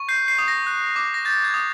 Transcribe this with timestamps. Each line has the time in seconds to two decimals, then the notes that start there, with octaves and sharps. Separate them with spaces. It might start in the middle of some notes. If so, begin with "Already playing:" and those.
Already playing: C#6
0.09 G6 C7
0.28 C7
0.38 D#6
0.48 A#6
0.67 F#6
0.96 D6
1.14 A#6
1.25 G6 A6
1.44 G#6
1.54 D#6